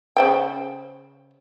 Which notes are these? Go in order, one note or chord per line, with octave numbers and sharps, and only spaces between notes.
C#3 C5 G5